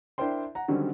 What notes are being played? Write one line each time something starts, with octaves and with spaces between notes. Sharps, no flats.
D4 E4 A#4 C5 G5 C6
F#5 A#5
D3 D#3 F#3 G3 C4 C#4